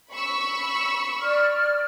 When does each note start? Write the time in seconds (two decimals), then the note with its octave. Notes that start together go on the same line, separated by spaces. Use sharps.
0.13 B5 C#6 E6
1.21 D5 F6